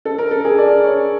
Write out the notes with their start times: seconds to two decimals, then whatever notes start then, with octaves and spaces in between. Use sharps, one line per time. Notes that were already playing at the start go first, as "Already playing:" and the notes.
0.05 A4
0.18 A#4
0.31 A4
0.45 G#4
0.58 D5
0.84 C#5